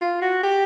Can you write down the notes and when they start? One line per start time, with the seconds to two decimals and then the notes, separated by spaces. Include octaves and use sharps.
0.01 F4
0.22 F#4
0.43 G4